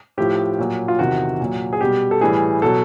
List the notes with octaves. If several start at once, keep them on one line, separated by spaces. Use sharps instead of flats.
A2 F3 G4
A#2 F#3
F4
E2 C3 D#3 F#4
A#2 F#3
G#4
B2 G3 G4
A4
A2 E3 G3 G#4
B2 F#3 A4